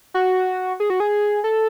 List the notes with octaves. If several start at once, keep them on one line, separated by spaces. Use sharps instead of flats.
F#4
G#4
F#4
G#4
A4